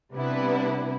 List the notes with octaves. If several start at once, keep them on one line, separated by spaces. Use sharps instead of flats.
C3 G3 B3 D4 E4 B4